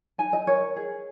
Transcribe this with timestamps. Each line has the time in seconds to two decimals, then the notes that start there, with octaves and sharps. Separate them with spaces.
0.18 D#4 G#5
0.33 D#5
0.47 A#4 C#5
0.76 G#4